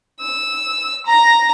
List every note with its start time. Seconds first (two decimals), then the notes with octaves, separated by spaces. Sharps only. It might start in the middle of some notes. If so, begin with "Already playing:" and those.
0.21 E6
1.06 A#5